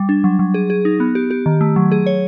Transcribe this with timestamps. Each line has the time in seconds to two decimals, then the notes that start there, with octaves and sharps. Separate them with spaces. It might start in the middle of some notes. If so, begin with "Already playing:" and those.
Already playing: G3
0.09 D4
0.24 F#3
0.39 F#3
0.54 G#4
0.70 G#4
0.85 D#4
1.00 B3
1.15 G4
1.31 G4
1.46 D#3
1.61 A3
1.76 F#3
1.92 G#4
2.06 C#5